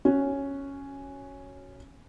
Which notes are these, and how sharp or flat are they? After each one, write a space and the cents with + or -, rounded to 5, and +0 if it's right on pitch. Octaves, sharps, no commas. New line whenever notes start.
C#4 +0 F#4 +0